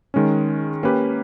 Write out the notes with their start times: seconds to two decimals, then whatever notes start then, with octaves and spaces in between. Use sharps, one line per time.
0.14 D#3 G#3 C#4
0.83 A#3 C#4 G4 B4